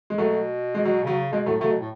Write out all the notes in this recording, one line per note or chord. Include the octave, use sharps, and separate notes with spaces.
G#3
B2 F#3 A3
G#3
F#3
C#3 F#3
B2 G#3
A2 F#3 A3
C#3 F#3 A3
B2
A2